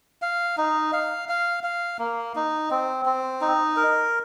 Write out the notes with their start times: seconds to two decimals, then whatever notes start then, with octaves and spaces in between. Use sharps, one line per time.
0.22 F5
0.58 D#4
0.93 F5
1.29 F5
1.63 F5
1.99 A#3
2.35 D#4
2.71 C4
3.06 C4
3.41 D#4
3.77 A#4